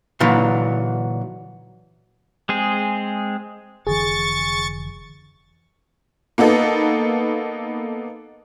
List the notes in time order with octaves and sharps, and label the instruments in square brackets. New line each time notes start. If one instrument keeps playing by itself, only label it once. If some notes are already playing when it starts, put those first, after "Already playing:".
[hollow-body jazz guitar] A#2 D3 E3 F#3
[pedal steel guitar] G#3 C4 G#4
[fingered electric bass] F1 D3 E3 [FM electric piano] G#4 [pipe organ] C#6 A6
[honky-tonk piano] A#3 B3 D#4 A4